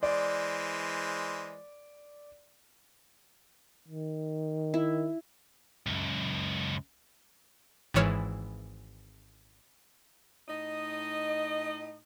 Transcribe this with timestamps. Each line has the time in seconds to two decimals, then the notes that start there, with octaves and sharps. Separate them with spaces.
0.03 E3 G#3 C5 D5
3.88 D#3
4.74 E4
5.87 C#2 F#2
7.94 G#1 G#2 E3 C#5 F6
10.48 A2 D#4 D#5